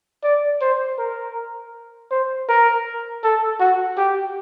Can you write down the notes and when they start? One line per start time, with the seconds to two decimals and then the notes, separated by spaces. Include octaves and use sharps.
0.23 D5
0.61 C5
0.98 A#4
2.11 C5
2.48 A#4
3.23 A4
3.60 F#4
3.97 G4